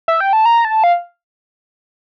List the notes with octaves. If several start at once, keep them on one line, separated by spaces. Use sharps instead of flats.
E5
G5
A5
A#5
A5
F5